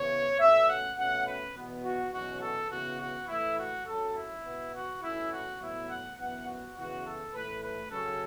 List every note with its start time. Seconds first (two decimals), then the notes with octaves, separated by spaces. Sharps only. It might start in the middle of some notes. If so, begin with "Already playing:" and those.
Already playing: C#3 E3 B3 C#5
0.38 B2 A3 C#4 E5
0.68 F#5
0.96 B2 A3 C#4 F#5
1.25 B4
1.54 E2 B2 B3
1.84 F#4
2.12 E2 B2 F#3 C#4 F#4
2.41 A4
2.70 C#3 E3 B3 F#4
2.99 F#4
3.27 A2 E3 A3 E4
3.57 F#4
3.85 F#2 F#3 C#4 A4
4.15 E4
4.43 B2 B3
4.73 F#4
5.01 B2 A3 C#4 E4
5.31 F#4
5.59 A2 F#3 B3 E4
5.88 F#5
6.17 F#2 E3 B3 F#5
6.45 F#4
6.74 E2 C#3 E3 B3 F#4
7.04 A4
7.33 A2 E3 A3 B4
7.62 B4
7.90 F#2 C#3 F#3 C#4 A4